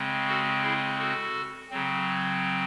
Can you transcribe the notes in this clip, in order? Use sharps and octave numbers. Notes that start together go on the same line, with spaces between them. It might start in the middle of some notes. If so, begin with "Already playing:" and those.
Already playing: C#3 G#3 C4
F#4 A4
E4 G#4
F#4 A4
C#3 F#3 C4